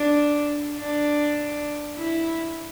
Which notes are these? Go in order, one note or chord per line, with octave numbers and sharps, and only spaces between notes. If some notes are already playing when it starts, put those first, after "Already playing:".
Already playing: D4
D4
E4